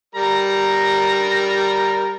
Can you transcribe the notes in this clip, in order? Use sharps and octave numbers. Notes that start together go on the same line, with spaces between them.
G3 A#4 A#5